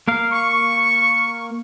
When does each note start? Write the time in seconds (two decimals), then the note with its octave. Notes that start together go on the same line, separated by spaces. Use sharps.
0.08 A#3 A#4 F5
0.32 C#6